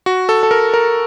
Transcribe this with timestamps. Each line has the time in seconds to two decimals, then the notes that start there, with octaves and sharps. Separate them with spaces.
0.06 F#4
0.29 A4
0.43 A4
0.51 A#4
0.74 A#4